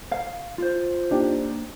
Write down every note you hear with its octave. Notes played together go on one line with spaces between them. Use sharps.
F5
F4 C5
A#3 D4 D#4 G4